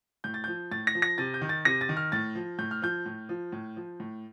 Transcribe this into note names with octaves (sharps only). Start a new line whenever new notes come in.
A2 G6
A6
F3 G6
A2 A6
A#6
F3
A#6
C3 A6
G6
D#3
A6
C3 A#6
A6
D#3
F6
A2 A6
F3
A2 G6
F6
F3 G6
A2
F3
A2
F3
A2